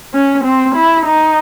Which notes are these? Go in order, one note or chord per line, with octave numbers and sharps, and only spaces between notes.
C#4
C4
E4
D#4